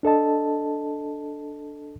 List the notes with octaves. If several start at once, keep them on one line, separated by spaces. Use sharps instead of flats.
D4 A4 D#5 A5